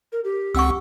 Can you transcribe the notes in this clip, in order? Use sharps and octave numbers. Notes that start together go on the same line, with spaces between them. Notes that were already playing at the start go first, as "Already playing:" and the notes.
A#4
G4
C#2 C4 F#5 C#6 E6